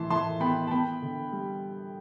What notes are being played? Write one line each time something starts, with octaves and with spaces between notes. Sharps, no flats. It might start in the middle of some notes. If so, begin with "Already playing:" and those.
Already playing: A2 E3 A5 C6
E3 A5 C6
B3 G5 B5
A5
B3 G5 B5
D3
G3